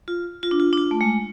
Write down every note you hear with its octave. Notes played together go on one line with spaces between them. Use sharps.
F4
F4
D4
F4
D4
F4
A3
G#3